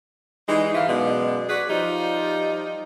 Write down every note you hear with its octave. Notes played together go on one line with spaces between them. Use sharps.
E3 G3 G#3 D#4
G#2 D#3 E3 F5
F#2 B2 G#3 B3 D5
F#4 G#4 B4 D5
F3 G3 D#4 F4 G4